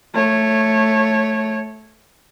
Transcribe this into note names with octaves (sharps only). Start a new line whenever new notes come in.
A3 C#5